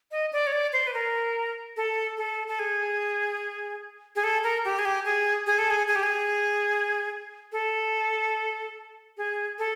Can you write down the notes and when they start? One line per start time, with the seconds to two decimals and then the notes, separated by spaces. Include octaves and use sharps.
0.11 D#5
0.33 D5
0.47 C#5
0.53 D5
0.73 C5
0.87 B4
0.94 A#4
1.77 A4
2.17 A4
2.48 A4
2.59 G#4
4.16 G#4
4.24 A4
4.44 A#4
4.65 G4
4.79 G#4
4.85 G4
5.05 G#4
5.47 G#4
5.58 A4
5.70 G#4
5.88 G#4
5.96 G4
6.03 G#4
7.52 A4
9.17 G#4
9.59 A4